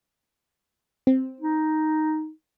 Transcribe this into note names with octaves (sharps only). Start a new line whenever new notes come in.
C4
D#4